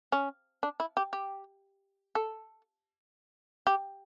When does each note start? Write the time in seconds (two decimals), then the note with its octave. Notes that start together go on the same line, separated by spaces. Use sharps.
0.12 C#4
0.63 D4
0.80 E4
0.97 G4
1.13 G4
2.15 A4
3.67 G4